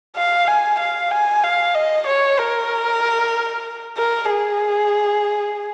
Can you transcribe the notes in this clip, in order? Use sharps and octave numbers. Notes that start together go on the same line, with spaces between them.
F5
G#5
F5
G#5
F5
D#5
C#5
A#4
A#4
G#4